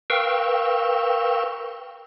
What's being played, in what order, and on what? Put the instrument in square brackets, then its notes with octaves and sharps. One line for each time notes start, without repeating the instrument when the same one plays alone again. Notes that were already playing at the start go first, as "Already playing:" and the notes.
[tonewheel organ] A#4 B4 F5 G5 C#6 E6